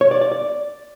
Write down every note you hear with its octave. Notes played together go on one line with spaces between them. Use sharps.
C#5
D5
D5
D5